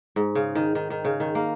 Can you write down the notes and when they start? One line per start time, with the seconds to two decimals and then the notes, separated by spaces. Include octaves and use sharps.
0.16 G#2
0.35 C#3
0.55 D#3
0.75 D#3
0.90 D#3
1.05 C#3
1.20 D#3
1.35 A#3